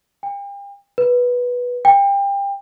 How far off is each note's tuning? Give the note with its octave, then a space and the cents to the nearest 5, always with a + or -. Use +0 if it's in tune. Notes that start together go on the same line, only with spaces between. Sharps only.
G5 +40
B4 -10
G5 +30